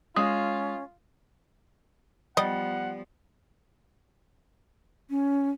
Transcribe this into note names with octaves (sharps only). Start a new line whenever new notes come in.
G#3 C#4 F4 D#6
F3 G3 B3 D#5 F#5
C#4